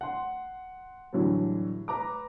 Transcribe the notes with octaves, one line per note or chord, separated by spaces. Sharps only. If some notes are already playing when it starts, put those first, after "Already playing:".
F#5 C6
A2 D3 E3 F#3 G3
B4 A#5 D6